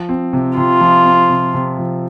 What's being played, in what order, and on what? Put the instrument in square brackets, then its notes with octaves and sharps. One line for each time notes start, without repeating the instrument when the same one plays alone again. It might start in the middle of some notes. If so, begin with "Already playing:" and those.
Already playing: [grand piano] F3
C4
C3
[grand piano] C3 [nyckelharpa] F4
[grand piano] F3
C4
C3
C3
F3